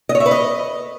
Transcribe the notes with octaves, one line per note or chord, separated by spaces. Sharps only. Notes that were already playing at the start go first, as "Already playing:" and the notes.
D#5
C#5
E5
B4
D#5